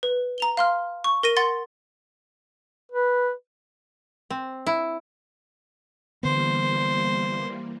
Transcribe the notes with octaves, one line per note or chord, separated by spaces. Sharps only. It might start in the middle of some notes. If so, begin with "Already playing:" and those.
B4
A#5 F7 G7
F5 C6 F6
C#6
A#4 A#6 D#7
F#5 C6 A6
B4
C4
E4
D3 E3 G3 A#3 B3 C5